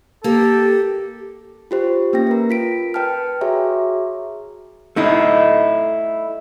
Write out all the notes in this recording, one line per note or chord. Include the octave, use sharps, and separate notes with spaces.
A#3 G4 A4
F4 G4 C5
A#3 C#4 G5 A#6
A#4 B4
F4 B6 D7
B4 G5 A5 F6
F#4 G#4 C#5 E5 A#5
A3 D#4 E4